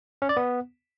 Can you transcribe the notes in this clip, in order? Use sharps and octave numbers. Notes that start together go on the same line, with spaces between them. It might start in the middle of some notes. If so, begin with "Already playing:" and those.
C#4
D5
B3